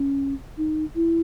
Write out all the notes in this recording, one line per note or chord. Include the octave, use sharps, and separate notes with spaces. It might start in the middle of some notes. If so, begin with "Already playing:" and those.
Already playing: C#4
D#4
E4